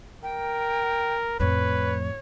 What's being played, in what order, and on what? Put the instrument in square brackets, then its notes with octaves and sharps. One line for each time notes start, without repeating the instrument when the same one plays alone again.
[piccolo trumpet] A#4 [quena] G5
[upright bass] F2 A2 [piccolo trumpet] B4 [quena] C#5